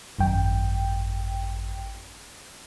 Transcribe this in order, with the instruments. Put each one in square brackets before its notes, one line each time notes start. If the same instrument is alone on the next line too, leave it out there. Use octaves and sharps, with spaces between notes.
[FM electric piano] G#1 F#2 G5